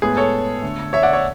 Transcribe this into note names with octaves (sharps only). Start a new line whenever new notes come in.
A2 G#3 B3 G#4
A4 C#5
D3 A3
C#5 E5
D5 F#5
C#5 E5